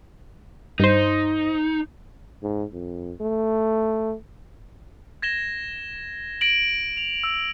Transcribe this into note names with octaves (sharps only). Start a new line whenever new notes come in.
G2 D#4 C5
G#2
F2
A3
G#6 A#6 E7 G7
A#6 D7 F#7
F7
E6